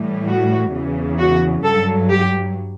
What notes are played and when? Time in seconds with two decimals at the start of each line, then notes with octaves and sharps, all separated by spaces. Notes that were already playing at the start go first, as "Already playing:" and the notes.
Already playing: A2 E3 G3
0.28 F#4
0.74 E2 C#3 E3
1.19 F#4
1.64 G2 F#3 A4
2.10 G4